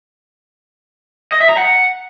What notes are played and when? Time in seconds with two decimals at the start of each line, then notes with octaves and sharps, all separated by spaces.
1.32 D#5
1.41 E5
1.49 A#5
1.58 F#5